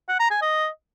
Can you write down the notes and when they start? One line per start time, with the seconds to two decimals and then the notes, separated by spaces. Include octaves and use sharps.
0.09 F#5
0.20 A#5
0.31 G#5
0.42 D#5